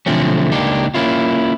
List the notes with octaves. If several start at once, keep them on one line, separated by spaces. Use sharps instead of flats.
B1 D3 F3 A3 C4 C#4
C#2 A#3 D4 D#4 G4
A#3 C#4 E4 F4